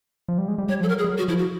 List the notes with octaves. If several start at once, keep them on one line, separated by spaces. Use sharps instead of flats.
F3
G3
G#3
G3
G3 C#5
F3 A4
F#3 A#4
G#4
G3
F#3
F#4
F3 E4
F#4